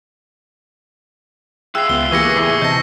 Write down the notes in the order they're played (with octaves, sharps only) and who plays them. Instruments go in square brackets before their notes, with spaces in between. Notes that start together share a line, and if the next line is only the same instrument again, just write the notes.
[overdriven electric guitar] F4 E5 [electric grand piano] G#4 G5 F#6 [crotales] E6 C7
[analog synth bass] C#2 [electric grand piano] B3 [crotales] G7
[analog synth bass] E3 [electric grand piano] A#3 G4 B4 [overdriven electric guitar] G#4 [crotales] C#6 A#6 C#7
[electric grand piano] E2 A2 E5 [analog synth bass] E3
[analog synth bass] C3 [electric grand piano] D#5 A5 [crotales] G6 A#6